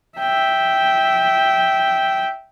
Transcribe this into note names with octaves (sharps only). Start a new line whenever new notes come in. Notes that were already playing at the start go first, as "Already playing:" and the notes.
E5 G5